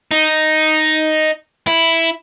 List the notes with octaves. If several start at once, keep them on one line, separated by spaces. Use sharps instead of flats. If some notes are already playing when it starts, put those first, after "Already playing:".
D#4
E4